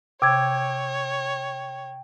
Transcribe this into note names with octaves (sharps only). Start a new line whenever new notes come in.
C3 C#5 G5 D6 E6 G#6